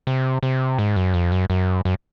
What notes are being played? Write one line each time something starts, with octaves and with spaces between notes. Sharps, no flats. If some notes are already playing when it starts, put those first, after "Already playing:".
C3
C3
G#2
F#2
F2
F#2
F#2
F#2